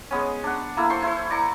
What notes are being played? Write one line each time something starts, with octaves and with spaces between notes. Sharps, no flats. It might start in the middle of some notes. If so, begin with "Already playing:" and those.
G#3 B3 C#4
D4 F#5
A#3 E4 A4
C5 C6 C#6
E4 C5 C#6
D5 A#5 C#6